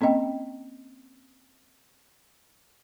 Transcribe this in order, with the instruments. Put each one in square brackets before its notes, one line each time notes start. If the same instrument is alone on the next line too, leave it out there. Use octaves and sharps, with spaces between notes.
[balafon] A#3 C4 C#4 D#5 G5